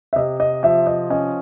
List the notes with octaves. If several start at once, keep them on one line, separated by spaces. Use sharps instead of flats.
E5
C3 D#5
D#5
F3 E5
D#5
C#4 D#5